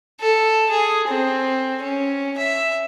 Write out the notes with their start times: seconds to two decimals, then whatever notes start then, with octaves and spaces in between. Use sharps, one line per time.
0.21 A4
0.70 G#4
1.08 C4
1.82 C#4
2.38 E5